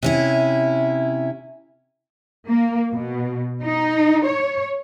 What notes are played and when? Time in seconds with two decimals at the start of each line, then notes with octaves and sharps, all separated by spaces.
0.03 C3 C#4 E4
2.47 A#3
2.93 B2
3.62 D#4
4.25 C#5